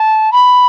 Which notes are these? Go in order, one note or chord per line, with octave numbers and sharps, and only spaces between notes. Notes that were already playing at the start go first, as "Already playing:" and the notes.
Already playing: A5
B5